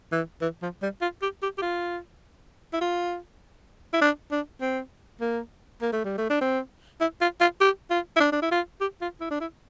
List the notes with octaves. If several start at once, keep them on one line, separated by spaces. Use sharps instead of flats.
E3
E3
F3
G3
F4
G4
G4
G4
F4
E4
F4
E4
D4
D4
C4
A#3
A#3
A3
G3
A3
D4
C4
E4
F4
F4
G4
F4
E4
D4
D4
E4
F4
G4
F4
E4
D4
E4